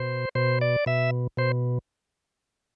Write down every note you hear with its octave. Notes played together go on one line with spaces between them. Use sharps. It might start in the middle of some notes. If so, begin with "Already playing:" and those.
Already playing: B2 C5
B2 C5
D5
B2 E5
B2 C5